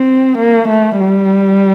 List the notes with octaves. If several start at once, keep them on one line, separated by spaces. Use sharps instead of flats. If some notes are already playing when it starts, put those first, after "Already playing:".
Already playing: C4
A#3
A3
G3